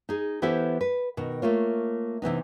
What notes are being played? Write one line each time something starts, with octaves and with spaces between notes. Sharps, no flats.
D#4 G#4
E3 B3 E4 G4 A4 C5
B4
B2 D#3
A3 A#3 F4 C#5
C3 E3 B3 D#4